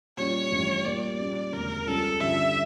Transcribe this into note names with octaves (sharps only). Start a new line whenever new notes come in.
A#2 G3 C#4 F4 C#5
A1 G2 F3 C#4
A#2 G3 A#3 D5
A#2 G3 C#4 G4
E1 D2 C#3 A#4
C#2 C#3 G3 C#4 F4 A4
G2 D3 G3 C#4 F4 E5